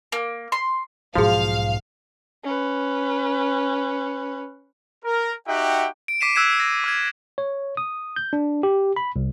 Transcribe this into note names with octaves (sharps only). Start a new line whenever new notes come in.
A#3
C6
B1 G#2 F3 F#4 G#4 F5
C#4 B4
A#4
D#4 F#4 G4 E5 F#5 G5
D7
D6 B6 C7 D#7 E7
E6 F#6 G#6 B6 E7
A#6
D6 F6 G#6
C#5
D#6
G6
D4
G4
B5
C2